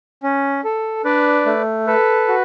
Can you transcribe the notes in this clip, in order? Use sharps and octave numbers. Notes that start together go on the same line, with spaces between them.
C#4
A4
D4 B4 D5
A3
A4 B4
F#4